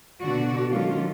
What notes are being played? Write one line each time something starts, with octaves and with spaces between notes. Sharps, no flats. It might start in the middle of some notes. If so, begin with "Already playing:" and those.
B2 D3 F#4 D5
D#3 F#3 G#3 C#4 F4 A4